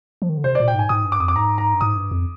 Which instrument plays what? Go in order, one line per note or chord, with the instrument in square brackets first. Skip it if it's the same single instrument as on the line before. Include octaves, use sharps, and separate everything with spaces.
[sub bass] F3
D#3
D3
[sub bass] C3 [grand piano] C5
[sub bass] A#2 [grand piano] D5
[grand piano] G5
[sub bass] G#2 [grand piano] G#5
[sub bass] G#2 [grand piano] D#6
[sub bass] G2
[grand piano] D6
[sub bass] F2 [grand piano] D#6
[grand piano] D6
[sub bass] G#2 [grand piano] A#5
[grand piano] A#5
[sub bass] G2
[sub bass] G#2 [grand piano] D#6
[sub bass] G2
F2